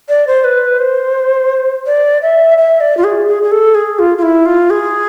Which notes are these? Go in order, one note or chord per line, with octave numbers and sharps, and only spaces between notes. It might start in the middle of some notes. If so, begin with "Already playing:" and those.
D5
C5
B4
C5
D5
E5
E5
D5
F4
G#4
G#4
G#4
A4
G#4
F4
F4
E4
F4
G#4